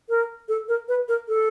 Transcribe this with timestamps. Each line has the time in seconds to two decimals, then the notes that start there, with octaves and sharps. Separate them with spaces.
0.09 A#4
0.48 A4
0.68 A#4
0.88 B4
1.08 A#4
1.28 A4